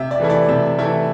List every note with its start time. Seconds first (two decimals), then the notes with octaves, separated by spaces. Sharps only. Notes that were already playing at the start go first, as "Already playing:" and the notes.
Already playing: C3 E5
0.11 D5
0.20 E3 A3 E4
0.30 D5
0.48 C3 E5
0.78 E3 A3 E4